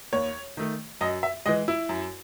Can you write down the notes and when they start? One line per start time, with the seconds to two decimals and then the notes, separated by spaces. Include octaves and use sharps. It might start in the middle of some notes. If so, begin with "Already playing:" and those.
0.13 D#2 C#5
0.57 D#3 A3
1.01 F#2 D#5
1.23 E5
1.46 E3 G#3 D#5
1.68 E4
1.89 F#2